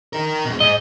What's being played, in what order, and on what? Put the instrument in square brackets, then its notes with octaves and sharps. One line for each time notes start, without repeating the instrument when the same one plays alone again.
[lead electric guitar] D#4 A#4
B2 G#3
[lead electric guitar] G#2 [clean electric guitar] D#5